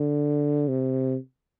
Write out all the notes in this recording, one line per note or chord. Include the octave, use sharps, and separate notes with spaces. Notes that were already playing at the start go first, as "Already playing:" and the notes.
Already playing: D3
C3